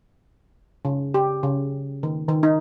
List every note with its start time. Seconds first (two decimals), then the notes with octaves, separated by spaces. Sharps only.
0.85 C#3
1.14 G4
1.43 C#3
2.03 D#3
2.29 D#3
2.43 D#4